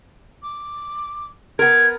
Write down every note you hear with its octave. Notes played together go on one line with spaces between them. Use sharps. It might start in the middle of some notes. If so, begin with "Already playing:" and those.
D6
B3 A#4 G#6